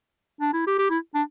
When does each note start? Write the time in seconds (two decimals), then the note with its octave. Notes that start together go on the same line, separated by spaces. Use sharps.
0.41 D4
0.53 E4
0.67 G4
0.78 G4
0.90 E4
1.15 D4